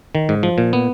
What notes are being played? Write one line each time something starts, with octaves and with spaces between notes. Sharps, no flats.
D#3
G#2
F3
A#2
B3